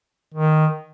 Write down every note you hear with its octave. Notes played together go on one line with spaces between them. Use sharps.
D#3